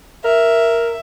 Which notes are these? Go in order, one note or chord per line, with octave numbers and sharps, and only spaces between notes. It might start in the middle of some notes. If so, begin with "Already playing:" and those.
A#4 E5